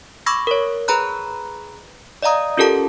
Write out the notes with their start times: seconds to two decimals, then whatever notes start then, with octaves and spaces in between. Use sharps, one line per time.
0.26 B5 C#6 D6 E6 G#6 A#6
0.47 A#4 C#5
0.88 G#4 B4 A#5 B5 F#6
2.22 D5 D#5 F5 A#5 D#6
2.57 C#4 F4 G4 A4 A#4 A5